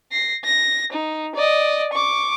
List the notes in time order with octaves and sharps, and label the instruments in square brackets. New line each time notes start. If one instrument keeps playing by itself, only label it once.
[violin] A#6 C7
A#6
D#4
D5 D#5
C#6 D6